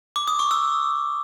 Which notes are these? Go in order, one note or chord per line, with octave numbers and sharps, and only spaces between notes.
D6
D#6
C#6
E6